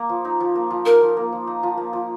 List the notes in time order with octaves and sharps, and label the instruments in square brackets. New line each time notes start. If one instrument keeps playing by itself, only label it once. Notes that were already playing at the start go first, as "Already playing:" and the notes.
Already playing: [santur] A#3
F3
D#4
F3
A#3
F3
[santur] D#4 [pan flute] A#4
[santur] F3
A#3
F3
D#4
F3
A#3
F3